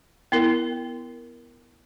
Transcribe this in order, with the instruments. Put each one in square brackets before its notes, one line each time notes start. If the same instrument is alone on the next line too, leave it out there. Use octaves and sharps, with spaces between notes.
[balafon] B3 E4 A#4